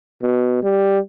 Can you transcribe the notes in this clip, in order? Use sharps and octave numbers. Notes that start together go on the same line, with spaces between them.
B2
G3